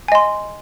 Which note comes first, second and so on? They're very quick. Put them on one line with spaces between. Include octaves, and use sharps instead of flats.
G#5 D#5 C6